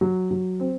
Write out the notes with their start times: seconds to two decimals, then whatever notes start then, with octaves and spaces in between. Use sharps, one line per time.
0.01 F#3
0.31 F#3
0.60 C4